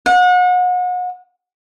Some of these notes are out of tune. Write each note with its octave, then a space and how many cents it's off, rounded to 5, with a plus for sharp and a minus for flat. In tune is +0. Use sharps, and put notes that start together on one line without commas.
F#5 -35